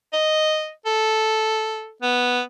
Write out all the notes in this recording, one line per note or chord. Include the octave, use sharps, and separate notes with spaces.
D#5
A4
B3